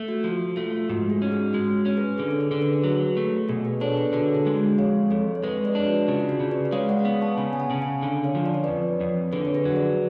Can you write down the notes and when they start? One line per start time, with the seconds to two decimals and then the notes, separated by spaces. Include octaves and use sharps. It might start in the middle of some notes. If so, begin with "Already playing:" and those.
Already playing: A3
0.08 F#4
0.23 F3 F#4
0.56 A3 F4
0.89 G#2 F#4
1.10 G#4
1.22 C#4
1.32 F#4
1.53 G#3 F#4
1.86 C#4
1.97 G#4 B4
2.18 D3 G#4
2.31 A4
2.41 G#4
2.51 D3
2.61 G#4 B4
2.84 F#3
3.17 A3
3.49 B2 G#4
3.65 G#4 B4
3.81 D4 A4 C#5
3.97 G#4 B4
4.13 D3 F#4 A4
4.35 G#4
4.46 G#3
4.57 F#4
4.78 F2 C#5 F5
5.10 F2 A4 C#5
5.35 C#5
5.43 G#3 G#4 B4
5.65 B4 D5
5.75 D4
5.86 F#4
6.08 C#3 F4
6.20 G#4
6.29 F#4
6.40 C#3
6.51 B4 D5
6.65 D5
6.72 G#3 C#5 F5
6.89 D5 F#5
6.99 F#5
7.05 B3 C#5 F5
7.21 A5 C#6
7.37 C#3 G#5 B5
7.53 G#5
7.60 F#5 A5
7.70 C#3
7.82 F5 G#5
8.03 D3
8.24 C#5 F5
8.35 F3
8.46 D5
8.54 C#5
8.64 F2 B4 D5
9.01 F2
9.33 D3 G#4 B4
9.45 C#5
9.54 G#4 B4
9.65 F#3
9.76 B4 D5